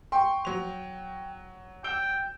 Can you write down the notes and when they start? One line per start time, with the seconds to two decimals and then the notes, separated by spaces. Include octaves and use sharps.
0.12 G5 C6 C#6
0.45 F#3 F7
1.84 G5 E6 D7 G7